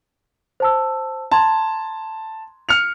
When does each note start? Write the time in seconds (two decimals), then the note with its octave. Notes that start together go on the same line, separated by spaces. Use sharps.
0.60 C5 A5 E6
1.32 A5 A#5 C6 G#6
2.69 F6 C#7 F7